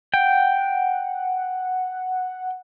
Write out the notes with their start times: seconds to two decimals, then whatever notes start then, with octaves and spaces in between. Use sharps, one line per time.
0.14 F#5 G5